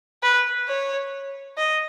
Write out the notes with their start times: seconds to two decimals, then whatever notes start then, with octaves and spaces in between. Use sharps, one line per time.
0.23 B4
0.68 C#5
1.58 D#5